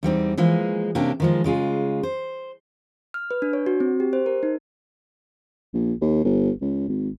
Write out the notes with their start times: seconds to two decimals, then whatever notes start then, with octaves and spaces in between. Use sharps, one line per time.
0.03 E2 G3 C4 D#4
0.38 E3 F3 G#3 A#3
0.95 C3 A#3 C#4 D4 G4
1.20 D#3 F3 G#3
1.44 C#3 G#3 F4 G#4
2.03 C5
3.14 F6
3.31 B4
3.42 D4
3.53 C#5
3.66 F#4
3.80 C4
4.00 G4
4.13 C5
4.26 A#4
4.43 D#4
5.74 A#1
6.01 D#2
6.24 G1
6.61 C#2
6.88 G#1